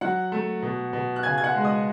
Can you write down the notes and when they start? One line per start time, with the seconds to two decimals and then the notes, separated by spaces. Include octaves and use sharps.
0.01 F#3 F#5 F#6
0.32 A3
0.62 B2
0.93 B2
1.16 F#6
1.23 C#3 G#5 G#6
1.38 G#6
1.44 F#5 F#6
1.54 G#3
1.65 D#5 D#6